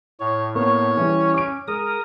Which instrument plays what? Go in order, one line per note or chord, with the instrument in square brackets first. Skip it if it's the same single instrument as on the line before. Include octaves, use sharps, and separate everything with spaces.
[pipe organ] A2 [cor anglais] C#5
[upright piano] A#3 B3 A#4 [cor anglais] C#5
[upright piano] E3 G3 [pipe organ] C#4
[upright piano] D6 D7
[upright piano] G#3 [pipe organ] A#4 D#6